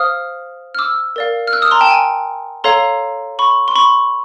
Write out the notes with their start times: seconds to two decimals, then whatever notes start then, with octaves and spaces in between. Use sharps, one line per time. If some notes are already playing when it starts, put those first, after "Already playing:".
Already playing: C5 F5 D#6 F6
0.75 F6
0.79 D6 E6
1.16 A#4 D5 F5
1.47 F6
1.53 E6 F#6
1.62 D#6 F6
1.71 A#5 C6
1.81 G5 A5
1.91 G#5
2.64 A4 C#5 F5 A#5 C6
3.39 B5 C#6
3.68 C6
3.76 B5 C#6